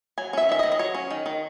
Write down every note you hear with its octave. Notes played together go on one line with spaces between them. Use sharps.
F#3 G#5
C#4 E5
D#3 E5
D#5
D#3
D#5
F#3 C#5
C#4
D#3
D#3